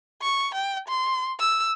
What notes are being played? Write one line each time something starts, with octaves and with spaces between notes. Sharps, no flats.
C#6
G5
C6
E6